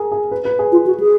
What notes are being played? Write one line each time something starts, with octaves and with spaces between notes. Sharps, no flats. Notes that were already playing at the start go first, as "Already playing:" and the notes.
Already playing: G#4 A#4
G#4
B4
B4
G#4
F4
F#4
G#4